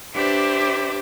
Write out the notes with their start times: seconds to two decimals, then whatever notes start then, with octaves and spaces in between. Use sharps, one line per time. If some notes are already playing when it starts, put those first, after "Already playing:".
0.14 D4 G4 B4 C5 D5 E5